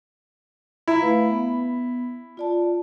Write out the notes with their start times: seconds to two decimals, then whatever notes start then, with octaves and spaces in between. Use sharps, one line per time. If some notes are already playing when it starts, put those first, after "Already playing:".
0.87 E4 A#5
1.01 A3 B4 F5
1.30 B3
2.37 F4 D5 A5